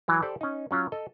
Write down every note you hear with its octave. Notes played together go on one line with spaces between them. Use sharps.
E3 F#3
G4 A4 C5 D5
C#4 D#4
F#3 C#4 F4
A4 D#5